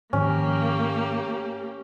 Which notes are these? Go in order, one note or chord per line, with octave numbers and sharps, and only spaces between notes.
G#2 D#3 F3 A#3 C#4 G4